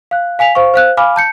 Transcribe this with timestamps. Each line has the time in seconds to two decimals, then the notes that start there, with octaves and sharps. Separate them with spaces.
0.11 F5 F#6
0.39 F5 G#5 B6 F7
0.55 C5 F5 C#6
0.74 C5 F5 F#6
0.97 F5 G#5 B5 D6 F6
1.16 A5 G6 C#7